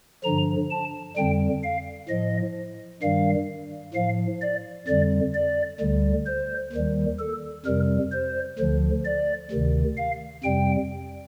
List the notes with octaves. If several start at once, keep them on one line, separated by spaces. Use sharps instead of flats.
G2 D3 F3 A#5
A5
F2 D3 G3 G5
F5
A2 F3 D#5
G2 D#3 G3 F5
A2 F3 F5
D5
F2 D3 G3 D5
D5
D2 D3 G3
C5
D#2 D#3 G3
A4
F2 C3 G3 A#4
C5
D2 D3 F3
D5
D2 C3 D#3
F5
F2 C3 G3 G5